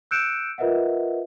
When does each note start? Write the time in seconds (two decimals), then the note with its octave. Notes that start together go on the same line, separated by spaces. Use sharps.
0.11 E6 F#6 G6 C#7 D7 E7
0.58 F4 A#4 B4 D#5 E5 F#5